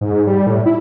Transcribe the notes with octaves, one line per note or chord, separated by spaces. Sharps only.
G#2
G3
A2
E4